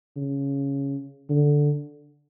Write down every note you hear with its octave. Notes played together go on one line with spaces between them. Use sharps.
C#3
D3